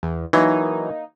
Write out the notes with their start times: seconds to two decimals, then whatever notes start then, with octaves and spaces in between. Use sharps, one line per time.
0.03 E2
0.33 E3 F#3 A#3 D#4